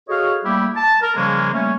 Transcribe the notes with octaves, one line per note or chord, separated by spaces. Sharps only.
F#4 G#4 A4 C#5 D#5 F5
G3 A3 A#3 E4 G4
A5
A#4
C#3 F3 G3 G#3 A#3 C#4
G3 A3 A#3 C#4